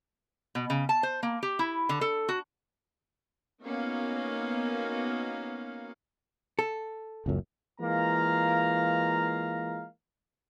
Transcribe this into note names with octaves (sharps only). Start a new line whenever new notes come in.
B2
C#3
A5
C5
A#3
G4
E4
D3
A4
F#4
A#3 B3 C#4 D#4 F#4 F5
A4
F#1 C#2 F#2
E3 G#3 A#3 F4 F5 A#5